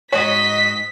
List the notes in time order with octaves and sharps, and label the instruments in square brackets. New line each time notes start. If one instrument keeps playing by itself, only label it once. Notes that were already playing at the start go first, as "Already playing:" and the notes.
[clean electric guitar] G#2 F#4 [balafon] C#5 [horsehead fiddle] D#5 [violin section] B6